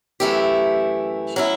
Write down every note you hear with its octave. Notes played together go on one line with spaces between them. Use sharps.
F#2 E3 A3 E4 G4
F#3 C#4 E4